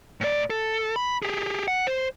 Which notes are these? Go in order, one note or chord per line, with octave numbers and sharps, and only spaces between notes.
A2 D5
A4
B5
G4 G#4
F#5
C5